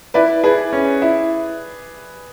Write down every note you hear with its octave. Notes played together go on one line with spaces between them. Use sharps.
E4 B4 D5
E4 G#4 B4
C#4
E4